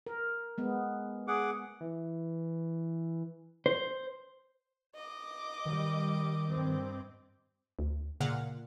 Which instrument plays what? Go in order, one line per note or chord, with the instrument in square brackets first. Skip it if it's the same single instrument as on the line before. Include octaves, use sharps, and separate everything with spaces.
[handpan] A#4
G#3 B3
[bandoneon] G#4 F#5 D6
[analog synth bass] E3
[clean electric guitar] C5
[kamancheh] D#5 D6
[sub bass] D#3 [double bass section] G3
[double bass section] G2 C4
[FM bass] D2
[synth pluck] A#2 F5 F#5 [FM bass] C#3